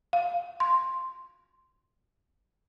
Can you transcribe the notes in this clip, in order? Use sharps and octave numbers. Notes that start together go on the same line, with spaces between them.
F5
C6